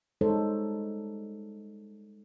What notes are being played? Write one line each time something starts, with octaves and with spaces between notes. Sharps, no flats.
G3 G#3 D#4 A4 C5 C#5